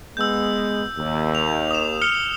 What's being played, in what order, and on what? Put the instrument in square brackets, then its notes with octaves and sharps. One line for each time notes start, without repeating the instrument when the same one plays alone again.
[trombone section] G#3 B3 [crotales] E6 G6
[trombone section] D#2
[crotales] F7
D#6 E7
F6 C#7 G7